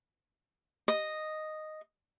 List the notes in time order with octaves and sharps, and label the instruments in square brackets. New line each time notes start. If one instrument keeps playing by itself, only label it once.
[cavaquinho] D#5